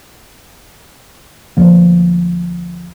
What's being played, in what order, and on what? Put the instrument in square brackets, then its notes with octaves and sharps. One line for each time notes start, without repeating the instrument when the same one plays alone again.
[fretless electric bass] D2 F3 A#3